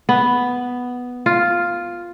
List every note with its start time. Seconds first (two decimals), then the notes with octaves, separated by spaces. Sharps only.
0.09 B3
1.26 F4